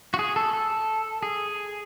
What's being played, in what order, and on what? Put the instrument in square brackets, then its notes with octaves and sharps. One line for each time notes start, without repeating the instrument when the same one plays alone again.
[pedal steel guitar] F#4
G#4
A4
A4
G#4